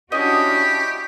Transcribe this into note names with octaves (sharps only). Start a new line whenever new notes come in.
C#4 D4 E4 F#4 G4 D#5